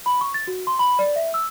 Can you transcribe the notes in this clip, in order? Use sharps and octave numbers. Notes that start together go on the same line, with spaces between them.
B5
C#6
A6
F#4
C6
B5
D5
E5
E6